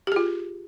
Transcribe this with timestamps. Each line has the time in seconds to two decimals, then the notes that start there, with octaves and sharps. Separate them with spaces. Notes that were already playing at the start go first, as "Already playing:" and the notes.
0.07 G4
0.12 G#4
0.16 F4